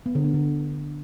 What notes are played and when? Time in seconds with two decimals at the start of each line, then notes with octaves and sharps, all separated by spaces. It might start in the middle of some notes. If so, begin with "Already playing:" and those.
0.06 B3
0.15 D3
0.24 B3
0.34 D3